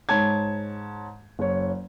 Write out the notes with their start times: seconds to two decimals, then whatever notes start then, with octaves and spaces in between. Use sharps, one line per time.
0.09 G#2 C#5 A5 G#6
1.39 F#1 C#5